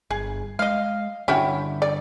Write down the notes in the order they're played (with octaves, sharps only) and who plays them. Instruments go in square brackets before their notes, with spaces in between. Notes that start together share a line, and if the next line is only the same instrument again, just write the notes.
[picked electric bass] G1 [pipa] G#4
[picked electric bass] G#3 [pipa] D#5 F5
[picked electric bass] G2 D3 [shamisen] C#4 F#4 G4 [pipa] E4
[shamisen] D5